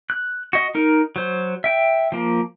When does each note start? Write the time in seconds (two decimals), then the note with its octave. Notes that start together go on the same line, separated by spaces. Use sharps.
0.10 F#6
0.53 F#4 D#5
0.75 D#4 A#4
1.16 F#3 C5
1.64 E5 G5
2.12 F3 A#3